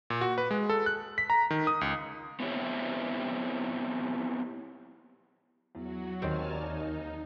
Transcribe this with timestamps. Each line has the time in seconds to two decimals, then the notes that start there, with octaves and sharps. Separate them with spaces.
0.10 A#2
0.21 F#4
0.38 B4
0.51 G#3
0.69 A4
0.86 F#6
1.18 B6
1.30 A#5
1.51 D#3
1.67 D#6
1.81 C#2
2.40 B3 C4 E4 G4 C#5
5.75 E2 F#3 F#4
6.22 D#2 D#3 C4 G4 C#5 G#5 A5 F6
6.51 D#4 A#4 C#5 D5
6.80 F6